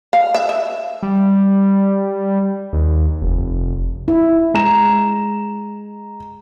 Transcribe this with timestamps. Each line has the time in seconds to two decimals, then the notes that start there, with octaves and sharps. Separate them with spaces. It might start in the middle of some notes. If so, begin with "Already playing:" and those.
0.13 F5
0.34 E5
0.49 E5
1.02 G3
2.73 D#2
3.22 F1
4.08 E4
4.54 G#3 A#5 E7